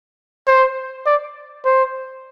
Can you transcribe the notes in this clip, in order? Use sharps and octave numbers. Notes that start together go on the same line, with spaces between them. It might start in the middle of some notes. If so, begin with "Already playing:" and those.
C5
D5
C5